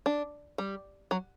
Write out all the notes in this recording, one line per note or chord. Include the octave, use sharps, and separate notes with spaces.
D4
G3
F#3